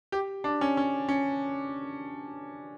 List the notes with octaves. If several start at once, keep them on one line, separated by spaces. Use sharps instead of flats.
G4
D4
C#4
C#4
C#4